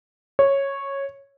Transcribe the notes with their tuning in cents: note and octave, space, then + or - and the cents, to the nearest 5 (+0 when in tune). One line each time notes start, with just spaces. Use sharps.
C#5 -10